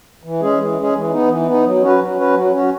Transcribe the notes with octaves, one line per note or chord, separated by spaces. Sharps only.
E3
G#3 C#4 G#4
E3
G#3 C#4 G#4
E3
B3 D#4
E3
B3 D#4
F#3
C#4 F#4 B4
F#3
C#4 F#4 B4
F#3
C#4 F#4